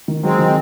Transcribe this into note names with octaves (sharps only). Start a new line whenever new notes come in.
D#3
F#3 G#3 C4
D#3